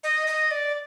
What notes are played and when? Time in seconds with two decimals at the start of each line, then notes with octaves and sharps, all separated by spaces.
0.03 D#5
0.27 D#5
0.51 D5